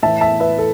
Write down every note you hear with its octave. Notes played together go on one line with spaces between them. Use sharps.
A2 E3 E5 A5
E5 A5
B4 E5
A4